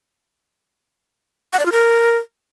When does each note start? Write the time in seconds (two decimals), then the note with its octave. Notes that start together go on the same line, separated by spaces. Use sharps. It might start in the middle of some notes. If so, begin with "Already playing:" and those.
1.53 F#5
1.59 D5
1.66 F4
1.72 A#4